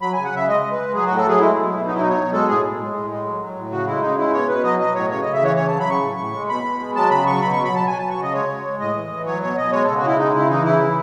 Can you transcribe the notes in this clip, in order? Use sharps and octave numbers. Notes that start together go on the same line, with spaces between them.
F#3 B5
C#3 G#5
F#5
C#3 E5
G#3 D#5
G#3
B4
G#3
F#3 G#4
A2 F#4
A4
F#3 G#4
G#3 E4
B2
B2
F#3 D#4
E4
B2 D#4
C#5
B2
G#3 A4
A2 G#4
A2
G#3
A2
G#3
F#3
F#3
A2
C#3 F#4
G#3 E4
C#3 D#4
G#3 E4
B2 C#5
B2 B4
F#3 D#5
F#3 D#5
A2 C#5
C#3 C#5
C#3 D#5
E5
E3 C#5
C#3 C#5
F#3 A5
B5
C#3 C#6
A2
A2
G#3
B2 B5
B2
G#3
F#3 A5
C#3 B5
F#3 C#6
B2 B5
F#3 C#6
B5
F#3 A5
F#3 G#5
F#3 A5
C#6
C#3 D#5
G#3 C#5
G#3
G#3
A2 D#5
E3
E3
F#3 C#5
B2 C#5
B2 D#5
G#3 C#5
C#3 A4
F#4
G#3 E4
C#3 D#4
C#3 E4
E3 D#4
C#3 E4
E3